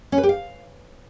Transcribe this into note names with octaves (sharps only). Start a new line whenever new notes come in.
C#4
B4
G4
F5